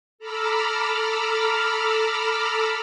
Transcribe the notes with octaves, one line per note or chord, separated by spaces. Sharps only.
A4 A#5 B5 D6 E6 F6